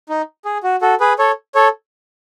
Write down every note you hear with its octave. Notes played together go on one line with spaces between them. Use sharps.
D#4
G#4
F#4
F#4 A4
G#4 B4
A4 C#5
A4 C#5